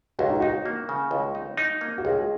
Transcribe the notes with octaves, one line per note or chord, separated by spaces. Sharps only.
C#2 F#4
D#4
D#4 F#4
A#3
C#3
C#2
D#4
D#4
A#3
F#4
C#2 G#4